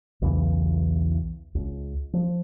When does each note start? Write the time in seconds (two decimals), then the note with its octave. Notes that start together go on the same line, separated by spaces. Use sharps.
0.22 B1 E2 C#3 E3
1.55 C#2
2.13 F3